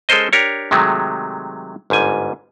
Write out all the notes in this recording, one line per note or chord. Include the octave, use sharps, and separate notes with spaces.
G#3 C#4 A4 A#4 C5 D#5
D4 G4 A#4 C#5
C3 D#3 F#3 G#3 A3
G1 G#2 G3 G#5